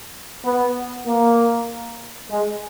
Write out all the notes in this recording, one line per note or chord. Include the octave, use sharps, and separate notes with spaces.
B3
A#3
G#3